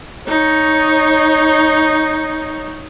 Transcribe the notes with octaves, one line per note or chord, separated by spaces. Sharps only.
D#4 C#5